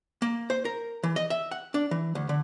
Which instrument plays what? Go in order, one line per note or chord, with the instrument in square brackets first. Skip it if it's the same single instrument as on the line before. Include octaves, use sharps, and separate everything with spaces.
[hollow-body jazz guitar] A#3
C5
A#4
E3
D#5
E5
F#5
D4
E3
D2
D3